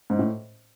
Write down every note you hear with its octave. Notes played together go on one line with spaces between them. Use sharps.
G#2
A2